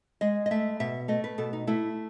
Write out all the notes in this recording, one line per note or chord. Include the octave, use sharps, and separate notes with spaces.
G#3 D#5
D#5
A3 E5
B2 E5
A3 D#5
B4
B2 A4
D#4
A3 E4